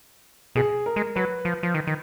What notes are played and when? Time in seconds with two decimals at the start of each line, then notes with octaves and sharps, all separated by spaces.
0.55 B2 G#4
0.86 A#4
0.96 G#3
1.16 F#3 B4
1.45 F3
1.63 F3
1.74 D#3
1.87 D#3